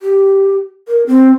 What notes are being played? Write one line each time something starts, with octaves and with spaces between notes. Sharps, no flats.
G4
A#4
C4